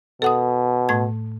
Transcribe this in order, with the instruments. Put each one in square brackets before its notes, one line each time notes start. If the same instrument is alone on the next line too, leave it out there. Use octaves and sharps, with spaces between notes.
[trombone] B2 [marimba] A4 F#5 D#6
[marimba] A2 A3 G#6